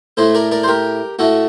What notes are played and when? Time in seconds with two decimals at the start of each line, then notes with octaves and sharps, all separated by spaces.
0.17 A2 A3 A4 C5
0.34 A#4 D5
0.51 A#4 D5
0.63 C5
0.68 G4 A#4
1.19 A2 A3 F#4 A4